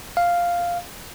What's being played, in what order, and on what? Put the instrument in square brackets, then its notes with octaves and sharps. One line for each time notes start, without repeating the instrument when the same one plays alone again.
[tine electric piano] F5